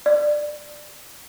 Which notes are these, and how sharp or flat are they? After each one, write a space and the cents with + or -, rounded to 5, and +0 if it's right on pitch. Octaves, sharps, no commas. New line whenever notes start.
D5 +15